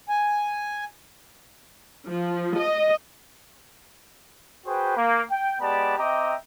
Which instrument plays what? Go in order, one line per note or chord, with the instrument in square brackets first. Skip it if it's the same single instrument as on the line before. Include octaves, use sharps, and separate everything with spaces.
[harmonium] G#5
[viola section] F3
D#5
[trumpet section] F#4 G#4 B4 C5 G5
A#3
G5
G#3 B3 G4 D5 A5 B5
C4 D#5 E5 G5 A#5 D6